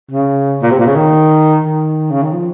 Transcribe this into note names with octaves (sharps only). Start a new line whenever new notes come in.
C#3
A#2
C3
A#2
C#3
D#3
D#3
C#3
D#3
F3